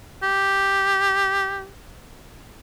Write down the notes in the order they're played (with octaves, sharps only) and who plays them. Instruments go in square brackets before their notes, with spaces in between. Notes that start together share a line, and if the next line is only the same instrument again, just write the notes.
[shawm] G4